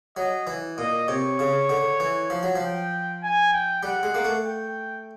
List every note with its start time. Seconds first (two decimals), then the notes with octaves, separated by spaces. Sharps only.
0.17 F#3 D#5
0.47 E3
0.78 A#2 D#5
1.08 C3 C#5
1.39 C#3
1.69 D3
2.00 E3
2.30 F3
2.43 F#3
2.56 F3
2.61 G5
3.23 G#5
3.53 G5
3.83 G3 F#5
4.03 G#3
4.15 A#3
4.25 A3
4.44 G5